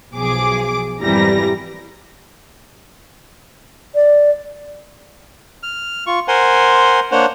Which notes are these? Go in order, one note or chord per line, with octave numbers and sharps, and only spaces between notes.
B1 F3 G#4 D6
G#1 F2 E3 G3 A#5 A#6
D5
F6
F4 C#6
A#4 C5 F#5 G#5 C6
A#3 D4 C5 C#5 F#5